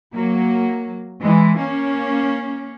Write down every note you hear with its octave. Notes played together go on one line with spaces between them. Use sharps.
F#3 A#3
E3 G#3
A#3 C#4